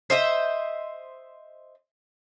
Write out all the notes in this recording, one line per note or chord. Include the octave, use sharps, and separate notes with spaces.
C5 D#5 E5